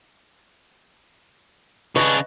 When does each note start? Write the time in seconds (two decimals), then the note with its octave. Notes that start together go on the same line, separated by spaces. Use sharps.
1.96 C#3 D4 B4 D#5 C#6